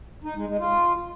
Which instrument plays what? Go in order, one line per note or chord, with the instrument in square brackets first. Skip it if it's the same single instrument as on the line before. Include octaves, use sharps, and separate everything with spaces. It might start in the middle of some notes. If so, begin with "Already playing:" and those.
[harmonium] D#4
G#3
G#3
F4